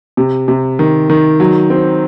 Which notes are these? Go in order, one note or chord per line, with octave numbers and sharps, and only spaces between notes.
C3
C3
D#3
D#3
F#3
C4